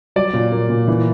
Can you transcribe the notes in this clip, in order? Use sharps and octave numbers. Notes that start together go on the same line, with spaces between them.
F#3 D5
A#2
A#3
A#2
E3